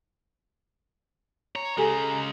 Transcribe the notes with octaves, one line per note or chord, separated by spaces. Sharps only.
C#5 A#5
C#3 G#3 G4 A4 G#5